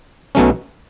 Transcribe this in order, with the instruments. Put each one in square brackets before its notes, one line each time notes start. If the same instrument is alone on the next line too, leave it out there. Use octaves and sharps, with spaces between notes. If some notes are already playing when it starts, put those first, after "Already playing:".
[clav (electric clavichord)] B1 B2 F#3 A3 C#4